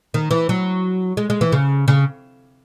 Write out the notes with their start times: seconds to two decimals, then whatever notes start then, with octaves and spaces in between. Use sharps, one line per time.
0.14 D#3
0.31 E3
0.49 F#3
1.17 G#3
1.30 G#3
1.41 E3
1.52 C#3
1.88 C#3